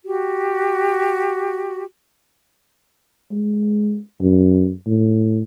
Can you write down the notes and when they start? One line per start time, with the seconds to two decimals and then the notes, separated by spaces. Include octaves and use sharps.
0.04 F#4 G4
3.31 G#3
4.21 F#2
4.87 A2